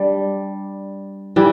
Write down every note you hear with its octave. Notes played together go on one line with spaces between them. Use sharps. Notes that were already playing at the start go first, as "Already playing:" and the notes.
Already playing: G3 D4
E3 G3